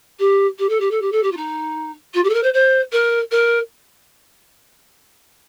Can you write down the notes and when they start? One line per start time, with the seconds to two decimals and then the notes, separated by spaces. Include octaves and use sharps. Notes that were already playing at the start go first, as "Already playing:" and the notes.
0.19 G4
0.59 G4
0.69 A4
0.80 G4
0.91 A4
1.01 G4
1.12 A4
1.23 G4
1.31 F4
1.36 D#4
2.14 F4
2.24 G4
2.29 A4
2.34 A#4
2.43 C5
2.53 C5
2.92 A#4
3.31 A#4